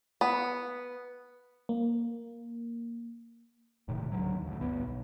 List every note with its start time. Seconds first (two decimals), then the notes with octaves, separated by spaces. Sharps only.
0.21 B3
1.69 A#3
3.88 E1 A2 C3 D#3
4.12 C#2 D3 F#3
4.35 D#2
4.48 D2 A2
4.59 G1 D2 B3
4.81 B1